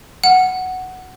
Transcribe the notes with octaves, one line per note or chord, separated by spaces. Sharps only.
F#5